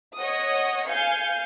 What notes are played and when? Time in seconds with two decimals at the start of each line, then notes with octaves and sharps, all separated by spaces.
0.17 C#5 D#5 F#5 D#6
0.86 F5 G#5 G6 C#7